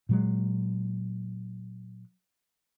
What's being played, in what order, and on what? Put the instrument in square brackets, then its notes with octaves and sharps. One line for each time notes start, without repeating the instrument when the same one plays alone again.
[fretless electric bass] A#2 F#3 G#3